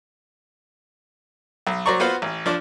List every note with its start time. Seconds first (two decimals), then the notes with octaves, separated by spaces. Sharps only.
1.67 B1
1.86 F#3 C5 D5 A#5 C#6
2.00 B3 F4 F#4 B4 C5 F5
2.22 A1
2.46 F3 D4 D6